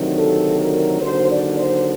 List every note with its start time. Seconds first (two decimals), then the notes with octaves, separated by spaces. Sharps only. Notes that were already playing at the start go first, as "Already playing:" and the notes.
Already playing: D2 C3 D#3 F#3
0.16 A4
0.59 A#4
1.01 D#2 D3 F#3 C5
1.30 D5
1.58 C5